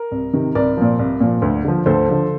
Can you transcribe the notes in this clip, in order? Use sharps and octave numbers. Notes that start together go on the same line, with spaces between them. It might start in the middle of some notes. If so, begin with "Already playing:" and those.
Already playing: A#4
C2
C3 D#3
C2 A#4 D5
A#2 F3
C2
A#2 F3
D2
D3 F3
D2 A4 C5
D3 F3